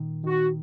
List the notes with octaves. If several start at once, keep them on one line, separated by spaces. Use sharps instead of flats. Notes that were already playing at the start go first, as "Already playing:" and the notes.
Already playing: A#2 D#3
D#3 F#4